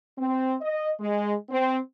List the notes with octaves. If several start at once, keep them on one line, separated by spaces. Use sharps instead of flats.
C4
D#5
G#3
C4